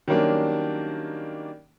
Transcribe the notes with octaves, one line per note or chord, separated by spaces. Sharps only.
D#3 F#3 G3 A#3 C#4 D4